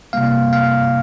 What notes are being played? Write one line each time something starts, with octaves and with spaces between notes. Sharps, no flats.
C3 G3 A#3 F5
F5